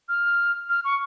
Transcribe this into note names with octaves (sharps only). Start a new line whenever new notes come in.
F6
F6
C#6